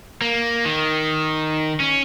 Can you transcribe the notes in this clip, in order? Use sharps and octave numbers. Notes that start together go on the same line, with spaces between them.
A#3
D#3
C#4